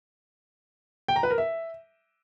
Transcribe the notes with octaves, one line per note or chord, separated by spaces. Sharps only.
G5
A#5
B4
A#4
E5